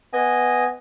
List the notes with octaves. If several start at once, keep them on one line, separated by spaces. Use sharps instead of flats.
B3 D#5 G#5